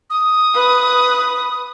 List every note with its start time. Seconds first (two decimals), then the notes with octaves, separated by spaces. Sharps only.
0.10 D#6
0.55 B4